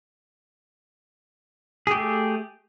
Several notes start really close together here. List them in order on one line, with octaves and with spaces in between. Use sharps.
G#4 G4 A3